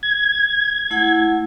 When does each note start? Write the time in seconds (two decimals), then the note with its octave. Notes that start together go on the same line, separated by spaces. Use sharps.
0.03 G#6
0.90 A3 E4 F#5